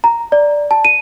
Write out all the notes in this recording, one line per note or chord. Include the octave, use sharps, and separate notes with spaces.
A#5
D5
A5
D#7